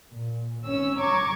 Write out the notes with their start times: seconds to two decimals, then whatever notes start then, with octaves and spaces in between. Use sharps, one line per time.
0.12 A#2
0.64 G#1 C#4 E6
0.99 A#5 C#6 D6 G#6